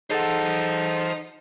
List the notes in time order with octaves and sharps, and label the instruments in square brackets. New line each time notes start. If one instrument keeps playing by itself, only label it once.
[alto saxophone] D#4 [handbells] G#4 A4 F#5 [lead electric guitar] C5 A5